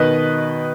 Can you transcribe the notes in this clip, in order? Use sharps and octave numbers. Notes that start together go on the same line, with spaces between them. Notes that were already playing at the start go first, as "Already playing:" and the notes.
Already playing: B2 D#3 B4 D#5